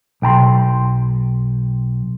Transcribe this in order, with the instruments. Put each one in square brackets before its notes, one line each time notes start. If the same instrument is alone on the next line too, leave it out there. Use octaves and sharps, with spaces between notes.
[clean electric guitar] B1 G5 A#5 C6